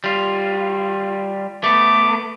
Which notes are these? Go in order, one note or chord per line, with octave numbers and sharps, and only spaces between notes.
G3 F4
A3 B3 D6